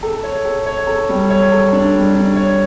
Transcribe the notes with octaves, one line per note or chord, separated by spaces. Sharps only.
A4
C#5
A4
C#5
A4
G3
C#5
A4
D4
G3
D4
C#5